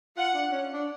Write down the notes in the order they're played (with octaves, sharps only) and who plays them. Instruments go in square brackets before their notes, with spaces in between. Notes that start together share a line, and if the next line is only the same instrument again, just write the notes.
[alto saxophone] F4 [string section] F#5
[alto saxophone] D4
C#4
D4